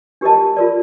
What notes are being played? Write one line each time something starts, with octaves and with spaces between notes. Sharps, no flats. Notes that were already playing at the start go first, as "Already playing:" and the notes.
D4 G4 A#4 D#5 A5
F4 A#4 D5